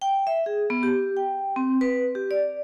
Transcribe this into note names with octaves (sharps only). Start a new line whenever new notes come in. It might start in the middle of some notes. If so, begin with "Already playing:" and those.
G5
E5
G#4
B3
G4
G5
C4
B4
G4
D5